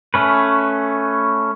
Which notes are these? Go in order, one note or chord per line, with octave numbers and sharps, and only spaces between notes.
A3 C#4 B4